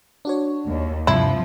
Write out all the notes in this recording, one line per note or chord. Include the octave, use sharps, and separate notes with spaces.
D4 F#4 C#5
D#2
G2 C3 F3 E4 C6